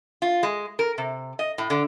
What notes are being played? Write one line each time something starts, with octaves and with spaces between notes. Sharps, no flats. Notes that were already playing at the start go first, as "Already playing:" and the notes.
F4
G#3
A#4
C3
D#5
A2
D3